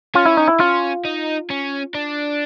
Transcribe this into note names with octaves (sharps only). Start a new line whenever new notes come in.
C#4 F4
E4
D#4
E4
C#4 F4
D#4
C#4
D4